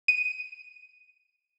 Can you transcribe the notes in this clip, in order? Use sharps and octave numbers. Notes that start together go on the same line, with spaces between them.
D#7